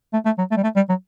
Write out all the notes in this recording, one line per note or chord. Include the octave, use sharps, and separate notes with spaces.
A3
A3
F#3
A3
G3
A3
G3
F#3